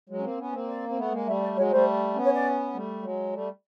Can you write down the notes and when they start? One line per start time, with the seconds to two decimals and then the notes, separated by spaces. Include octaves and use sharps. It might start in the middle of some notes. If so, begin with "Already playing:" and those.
0.09 F#3 G#3
0.18 C#4
0.23 A#3 C4
0.38 B3 C#4
0.53 A#3 C4
0.68 D5
0.89 C4
0.97 A3 B3
1.12 G#3 A#3
1.26 G3 A3 E5
1.41 D5
1.56 F#3 G#3 C#5
1.70 G3 A3 C5
2.15 B3 C#4
2.24 C#5
2.34 D5
2.73 G3 A3
3.03 F#3 G#3
3.33 G3 A3